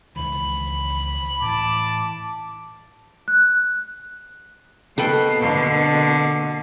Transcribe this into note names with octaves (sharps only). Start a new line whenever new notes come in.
C#2 D#3 E3 B5
A2 E3 A5 D6
F#6
B2 A#3 A4 B4 G5
D3